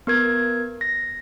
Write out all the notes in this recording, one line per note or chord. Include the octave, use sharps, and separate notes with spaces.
B3 A#4 G#6
A#6